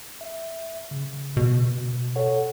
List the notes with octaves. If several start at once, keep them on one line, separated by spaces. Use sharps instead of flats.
E5
C#3
B2
A4 C#5 F#5